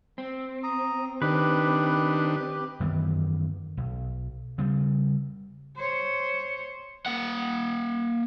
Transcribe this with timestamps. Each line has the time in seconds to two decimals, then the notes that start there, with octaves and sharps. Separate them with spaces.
0.18 C4
0.63 A#5 D#6
1.22 D#3 D4 G4 B4
2.80 F#2 D#3 E3 B3
3.77 B1
4.58 C#3 G3
5.76 C5 C#5
7.06 A#3 F#5